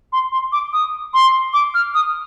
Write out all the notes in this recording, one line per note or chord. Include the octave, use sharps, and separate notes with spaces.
C6
C6
D6
D#6
C6
D6
F6
D#6